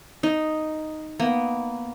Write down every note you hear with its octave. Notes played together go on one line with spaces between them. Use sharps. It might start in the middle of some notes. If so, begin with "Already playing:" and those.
D#4
A#3 B3